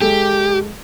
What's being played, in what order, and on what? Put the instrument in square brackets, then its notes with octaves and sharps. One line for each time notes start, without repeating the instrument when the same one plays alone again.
[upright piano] G#3 A4 [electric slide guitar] G4